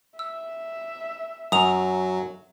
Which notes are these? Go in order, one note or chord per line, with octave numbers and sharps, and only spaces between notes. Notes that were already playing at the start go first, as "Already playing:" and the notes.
E5 E6
F#2 F#3 D#6 F7